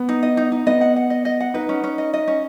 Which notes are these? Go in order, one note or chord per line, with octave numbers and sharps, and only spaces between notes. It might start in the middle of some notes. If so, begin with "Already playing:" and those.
Already playing: B3
D#4
D#5
D#4
D#4
B3 D#5
F#5
F#5
D#5
D#5
F#5
D#4 B4
C#4
C#4
D#5
D#5
C#4